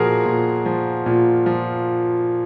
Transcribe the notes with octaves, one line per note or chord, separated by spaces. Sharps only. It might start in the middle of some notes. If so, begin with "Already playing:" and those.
Already playing: A#2 F3 F#4 G#4 A#4
A#2
F3
A#2
F3